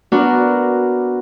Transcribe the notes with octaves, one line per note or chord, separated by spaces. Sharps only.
B3 D4 F#4 A#4